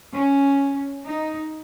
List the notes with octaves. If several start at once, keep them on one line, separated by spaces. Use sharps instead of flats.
C#4
D#4